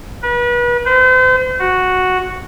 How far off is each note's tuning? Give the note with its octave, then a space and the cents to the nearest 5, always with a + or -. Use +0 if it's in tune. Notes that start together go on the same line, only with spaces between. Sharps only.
B4 -35
C5 -40
F#4 -5